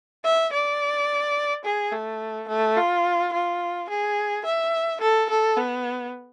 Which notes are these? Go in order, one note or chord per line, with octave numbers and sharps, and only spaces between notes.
E5
D5
G#4
A3
A3
F4
F4
G#4
E5
A4
A4
B3